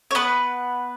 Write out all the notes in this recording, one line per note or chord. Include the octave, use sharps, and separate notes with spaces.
C#5
B3 B4